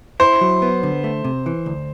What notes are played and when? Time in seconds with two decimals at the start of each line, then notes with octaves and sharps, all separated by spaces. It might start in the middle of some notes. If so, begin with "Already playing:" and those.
0.20 E4 C5
0.41 F#3
0.62 B3
0.83 D3
1.04 A3
1.24 C3
1.46 E3
1.66 D2